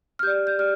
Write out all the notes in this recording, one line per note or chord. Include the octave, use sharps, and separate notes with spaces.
F6
G4 D5 G6
G6
G4 D5 F6